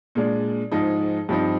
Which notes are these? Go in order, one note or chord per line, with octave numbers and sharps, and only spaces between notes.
A#2 G#3 D4
G#2 F3 G#3 D#4
G2 F3 C4 D#4